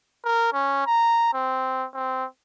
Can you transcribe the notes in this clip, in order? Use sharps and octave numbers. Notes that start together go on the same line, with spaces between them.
A#4
C#4
A#5
C4
C4